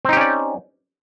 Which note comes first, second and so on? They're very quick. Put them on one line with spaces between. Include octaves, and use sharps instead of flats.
C4 D#4 G4 C#4 D5